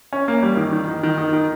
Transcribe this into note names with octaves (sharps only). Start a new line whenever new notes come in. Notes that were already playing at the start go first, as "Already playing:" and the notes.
C#4
A#3
G3
D#3
D#3
D#3
D#3
D#3
D#3